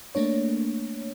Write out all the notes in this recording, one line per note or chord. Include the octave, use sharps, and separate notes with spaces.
A3 A#3 D4 C#5